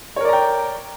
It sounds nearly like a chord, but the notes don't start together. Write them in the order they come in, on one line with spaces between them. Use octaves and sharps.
C#5 A#4 D5 A#5 G5